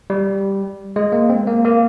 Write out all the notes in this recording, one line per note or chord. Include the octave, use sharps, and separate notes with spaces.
G3
G#3
A#3
C4
A#3
A#3